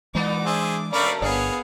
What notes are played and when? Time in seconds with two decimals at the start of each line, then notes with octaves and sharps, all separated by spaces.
0.15 A#2 E3 G#3 B3 D#4 D6
0.46 D4 G#4 C5 E5
0.93 B2 A3 C#4 A#4 D5 F5 B5 C#6
1.22 G1 B3 D4 G#4 C#5 F5